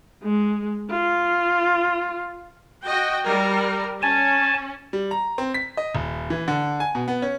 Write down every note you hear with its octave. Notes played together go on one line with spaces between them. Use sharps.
G#3
F4
F#4 D#5 G5
G3 A#4
C#4 G#5 A5
G3
A#5
C4
B6
D#5
D#1
E3
D3
G#5
B2
B3
C#4